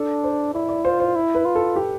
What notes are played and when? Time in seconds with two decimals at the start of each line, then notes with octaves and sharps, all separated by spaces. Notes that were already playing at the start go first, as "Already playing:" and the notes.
Already playing: D4 A4
0.24 C5
0.54 E4 D5
0.69 D5
0.85 F4 C5
1.00 C5
1.16 E4
1.35 B4
1.45 F4
1.55 A4
1.76 G4